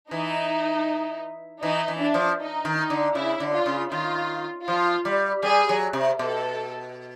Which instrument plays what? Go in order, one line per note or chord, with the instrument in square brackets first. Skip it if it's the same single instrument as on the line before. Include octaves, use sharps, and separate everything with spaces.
[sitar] E3 [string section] D#4
[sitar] E3 [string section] D#4
[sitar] E3
[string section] D4
[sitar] F3
[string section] D#4
[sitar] D#3
[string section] D#4
[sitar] D3
[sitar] C#3 [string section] E4
[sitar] D3
[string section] F4
[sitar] C#3
[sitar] D#3 [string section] F4
[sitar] F3 [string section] F4
[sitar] G3
[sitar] G3 [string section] G#4
[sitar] F#3
C3
[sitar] B2 [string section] A4